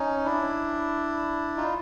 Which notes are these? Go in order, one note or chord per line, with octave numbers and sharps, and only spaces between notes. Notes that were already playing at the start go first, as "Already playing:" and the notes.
Already playing: C#4 D#4
D4 E4
D#4 F4